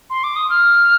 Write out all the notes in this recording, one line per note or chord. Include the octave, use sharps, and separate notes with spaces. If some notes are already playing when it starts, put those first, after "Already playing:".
C6
D6
D#6
F6